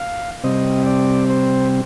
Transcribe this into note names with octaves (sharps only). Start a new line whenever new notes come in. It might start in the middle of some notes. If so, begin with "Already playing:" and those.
Already playing: F5
C3 G3 C4 D#5
D5
C5